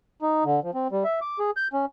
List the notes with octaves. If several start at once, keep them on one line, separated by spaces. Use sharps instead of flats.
D#4
D3
F3
C4
G3
E5
D6
G#4
G6
C#4